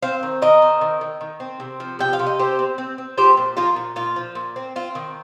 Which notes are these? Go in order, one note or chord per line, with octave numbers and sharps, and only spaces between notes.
C4 C5 F5
D#3
D#3 A#4 D#5
C4
D#3
D#3
D#3
C4
C3
F3
C3 G5
F5
C3
D#5
C4 G4 C5
C4
C4
C4
F3 G4 C5
A#2
F3 F4 A#4
A#2
A#2 F4
F3
A#2
C4
C4 F4
D#3